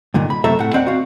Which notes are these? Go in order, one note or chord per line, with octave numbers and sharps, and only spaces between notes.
G2 A#2 D3 D#3
B5
F#2 C3 A3 A4 E5 A#5
A2 F#5
D#2 C4 D5 F#5
F#4 F5